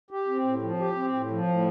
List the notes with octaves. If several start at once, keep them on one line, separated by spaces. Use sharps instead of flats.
G4
C4
A2
F3
G4
C4
A2
F3
A2